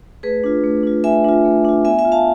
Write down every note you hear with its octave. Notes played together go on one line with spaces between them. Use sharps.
A3 G#4 B4
D4 F4
A3
D4 F4
A3 E5 G#5
D4 F4
A3
D4 F4
B3 E5 G#5
E5 G#5
F4
F5 A5